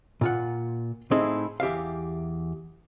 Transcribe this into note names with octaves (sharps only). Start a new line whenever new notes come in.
A#2 F4 F#5
A2 C4 D#4 E4 G#4
E2 G4 E5 F5